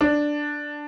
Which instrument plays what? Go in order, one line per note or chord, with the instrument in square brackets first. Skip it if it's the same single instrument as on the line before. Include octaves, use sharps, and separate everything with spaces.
[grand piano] D4